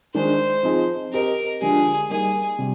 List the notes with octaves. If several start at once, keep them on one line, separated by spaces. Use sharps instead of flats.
D#3 G#3 D4 C5
F3 C4 D#4 G#4
C4 G4 A#4 C5 D#5
D3 F3 G#3 D4 G4 G#4
G3 A#3 D#4 G#4 A#4
C3 G3